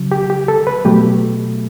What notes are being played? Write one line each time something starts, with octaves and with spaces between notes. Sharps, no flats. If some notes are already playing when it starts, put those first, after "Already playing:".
Already playing: C#3 F#3
G4
G4
A4
B4
B2 F#3 A3 G4